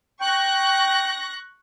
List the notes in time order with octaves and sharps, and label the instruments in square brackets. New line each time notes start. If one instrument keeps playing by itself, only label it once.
[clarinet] G5 [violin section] C#6 F#6 A#6